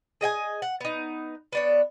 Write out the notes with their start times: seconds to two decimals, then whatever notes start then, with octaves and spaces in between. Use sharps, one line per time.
0.21 G#4 D#5 G5 G#5
0.62 F#5
0.80 B3 D#4
1.52 B3 D4 C#5